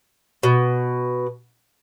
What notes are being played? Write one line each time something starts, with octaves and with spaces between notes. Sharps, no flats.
B2